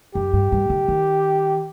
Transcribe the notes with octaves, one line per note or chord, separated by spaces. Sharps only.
F#2 G4
G2
G2
D3
D#3